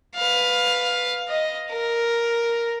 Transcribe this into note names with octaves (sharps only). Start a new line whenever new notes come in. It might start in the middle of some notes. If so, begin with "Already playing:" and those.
B4 F5
D#5
A#4